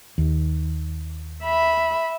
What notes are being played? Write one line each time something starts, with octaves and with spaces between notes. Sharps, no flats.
D#2
E5 B5